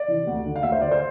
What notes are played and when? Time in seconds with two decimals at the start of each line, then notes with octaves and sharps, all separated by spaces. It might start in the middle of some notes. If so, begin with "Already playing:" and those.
Already playing: D5
0.08 C3 E3
0.27 D2
0.45 D3
0.56 F5
0.63 D2 E5
0.72 C5
0.81 D3 D5
0.91 C5